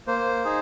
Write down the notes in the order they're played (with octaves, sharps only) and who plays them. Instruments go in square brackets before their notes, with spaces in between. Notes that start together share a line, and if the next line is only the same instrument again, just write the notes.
[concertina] A#3 C5
D#4 G#4